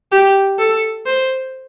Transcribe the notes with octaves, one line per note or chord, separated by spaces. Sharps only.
G4
A4
C5